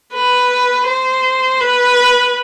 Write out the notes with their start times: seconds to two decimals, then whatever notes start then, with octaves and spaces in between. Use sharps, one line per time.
0.14 B4
0.87 C5
1.61 B4